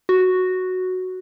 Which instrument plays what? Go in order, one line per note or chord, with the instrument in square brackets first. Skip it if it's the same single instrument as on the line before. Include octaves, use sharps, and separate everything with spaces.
[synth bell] F#4